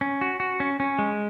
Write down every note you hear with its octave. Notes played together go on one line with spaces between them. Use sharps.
C#4
F#4
F#4
C#4
C#4
G#3